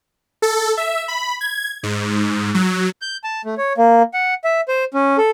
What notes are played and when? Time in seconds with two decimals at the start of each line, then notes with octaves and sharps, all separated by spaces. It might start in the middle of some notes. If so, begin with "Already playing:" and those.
0.42 A4
0.77 E5
1.08 B5
1.41 G#6
1.83 G#2
2.54 F#3
3.02 G6
3.24 A5
3.45 A3
3.58 C#5
3.78 A#3
4.14 F#5
4.44 E5
4.68 C5
4.94 C#4
5.18 A4